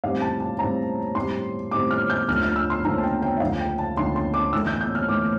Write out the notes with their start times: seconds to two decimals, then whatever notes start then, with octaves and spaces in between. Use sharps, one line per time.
0.04 A2 G3 C4 G4 F5
0.22 A5
0.40 A5
0.59 A2 G3 C4 G4 A#5
1.15 A2 G3 C4 G4 C6
1.71 A2 G3 C4 G4 D6
1.91 F6
2.10 G6
2.28 D2 D3 F3 A3 F6
2.43 F6
2.56 E6
2.70 C6
2.84 D2 D3 F3 A3 A#5
2.98 A5
3.04 G5
3.22 G5
3.37 E5
3.40 D2 D3 F3 A3 F5
3.60 G5
3.79 A5
3.96 D2 D3 F3 A3 C6
4.16 C6
4.34 D6
4.52 A2 E3 A3 E6
4.67 G6
4.81 G6
4.95 F6
5.09 A2 E3 A3 D6